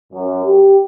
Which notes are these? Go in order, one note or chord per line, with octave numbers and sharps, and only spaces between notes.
F#2
G4